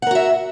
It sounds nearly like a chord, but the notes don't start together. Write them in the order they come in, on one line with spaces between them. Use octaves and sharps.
F#5 A#4 F#4 E5